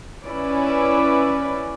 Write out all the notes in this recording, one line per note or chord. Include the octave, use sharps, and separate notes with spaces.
C#4 E4 B4 D5